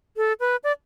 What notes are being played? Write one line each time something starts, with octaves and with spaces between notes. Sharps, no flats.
A4
B4
D5